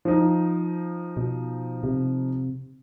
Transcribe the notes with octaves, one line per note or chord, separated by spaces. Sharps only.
F3 D#4
B2
C3